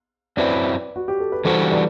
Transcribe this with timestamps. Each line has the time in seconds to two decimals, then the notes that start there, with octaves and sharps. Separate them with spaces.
0.37 F#2 F#3 C4 E4 B4 D5
0.96 F#4
1.08 G4
1.20 A4
1.32 B4
1.45 E3 G3 D4 F#4 A4 C5
1.72 B4 D5